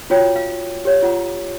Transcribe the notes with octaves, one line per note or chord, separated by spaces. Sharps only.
F4 F#4 C#5 G5
F5
G4 C#5
F4 F#5 A#5